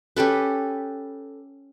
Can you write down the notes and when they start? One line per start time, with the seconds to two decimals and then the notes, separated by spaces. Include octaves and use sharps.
0.16 C#4 G4 A4 B4